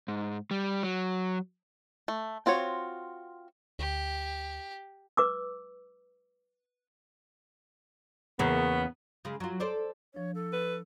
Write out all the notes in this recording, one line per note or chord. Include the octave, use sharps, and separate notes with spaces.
G#2
G3
F#3
A3
C4 F4 F#4 C#5
D2 G4
B4 D6 E6
E2 C#3 A#3 B3
C#3 G#3
F#3 F4
A4 C5 D5
F3 D4 C#5
A4
B4